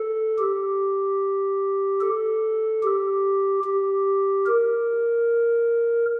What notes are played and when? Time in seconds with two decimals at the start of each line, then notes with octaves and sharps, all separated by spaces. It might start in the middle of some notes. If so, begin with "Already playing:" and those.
Already playing: A4
0.38 G4
2.01 A4
2.83 G4
3.64 G4
4.46 A#4